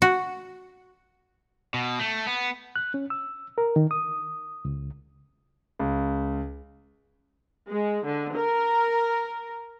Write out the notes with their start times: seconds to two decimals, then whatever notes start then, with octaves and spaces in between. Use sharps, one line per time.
0.02 F#4
1.74 B2
2.00 A3
2.27 B3
2.76 F#6
2.94 C#4
3.10 E6
3.58 A#4
3.76 D#3
3.91 D#6
4.65 C#2
5.79 C#2
7.71 G#3
8.07 D3
8.38 A#4